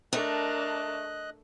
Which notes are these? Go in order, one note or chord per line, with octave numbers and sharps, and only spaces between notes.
A3 D4 A#4 D#5 F#6